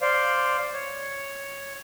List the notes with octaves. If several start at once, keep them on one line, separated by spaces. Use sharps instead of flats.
C5 D5 F5
C#5